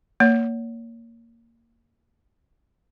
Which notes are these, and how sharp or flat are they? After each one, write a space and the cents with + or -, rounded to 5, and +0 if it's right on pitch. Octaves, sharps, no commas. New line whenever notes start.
A#3 -15 C#5 +30